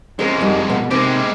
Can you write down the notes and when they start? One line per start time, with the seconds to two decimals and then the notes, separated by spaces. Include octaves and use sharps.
0.19 F2 G#3 C#4 A#4 C5
0.41 F#2 G3 D#4
0.70 B2 A#3
0.91 C3 D#3 G#3 C4 G4